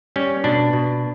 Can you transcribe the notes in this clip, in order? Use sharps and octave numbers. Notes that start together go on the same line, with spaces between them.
G3 C#4
B2 D4
B2